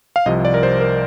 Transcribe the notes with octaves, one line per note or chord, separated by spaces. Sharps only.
F5
C2 C3 F3 D#5
D5
A#4
C5
A#4